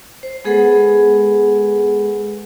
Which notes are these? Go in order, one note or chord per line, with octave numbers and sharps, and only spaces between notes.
C5
G#3 B3 G#4 A4 B4 F#5